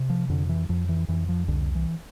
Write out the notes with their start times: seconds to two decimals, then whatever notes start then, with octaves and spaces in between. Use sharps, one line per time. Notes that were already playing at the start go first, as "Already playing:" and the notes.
Already playing: C3
0.10 F3
0.29 F2 D3
0.49 E3
0.69 F2 F3
0.89 E3
1.08 F2 E3
1.29 F3
1.48 C2 D3
1.75 E3